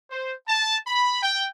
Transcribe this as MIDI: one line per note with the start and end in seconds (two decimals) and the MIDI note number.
0.11 0.34 72
0.48 0.78 81
0.87 1.20 83
1.22 1.47 79